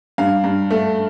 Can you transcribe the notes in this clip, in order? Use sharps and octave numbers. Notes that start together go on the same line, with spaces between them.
G2 F5
G2
A3